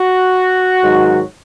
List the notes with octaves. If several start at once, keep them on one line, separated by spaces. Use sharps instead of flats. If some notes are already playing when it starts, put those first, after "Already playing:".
Already playing: F#4
G#2 D#3 F#3